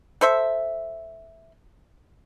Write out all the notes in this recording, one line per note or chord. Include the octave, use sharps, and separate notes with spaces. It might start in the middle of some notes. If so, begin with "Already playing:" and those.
A4 C5 E5